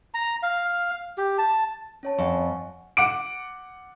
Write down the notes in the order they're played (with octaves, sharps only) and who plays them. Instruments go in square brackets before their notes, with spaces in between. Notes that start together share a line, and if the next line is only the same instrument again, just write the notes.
[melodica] A#5
F5
G4
A5
[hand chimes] C#4 C#5 A5
[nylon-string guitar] F2 [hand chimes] F#5 G#5 C#6
[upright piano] F#5 D6 D7